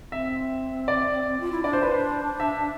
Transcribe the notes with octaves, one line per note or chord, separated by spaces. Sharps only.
C4 E5
D5
F4
E4
D4 D5
C5
B4
C5
E5